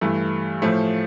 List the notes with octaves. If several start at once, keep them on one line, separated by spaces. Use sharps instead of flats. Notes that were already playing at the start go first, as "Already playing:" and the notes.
G2 E3 A3
A2 F3 A3